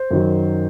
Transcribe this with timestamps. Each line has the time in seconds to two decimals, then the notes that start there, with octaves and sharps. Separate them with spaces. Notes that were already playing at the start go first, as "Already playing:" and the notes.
Already playing: C5
0.11 F#2 D#3 F#3